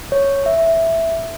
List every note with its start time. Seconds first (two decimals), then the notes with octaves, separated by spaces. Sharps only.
0.12 C#5
0.46 E5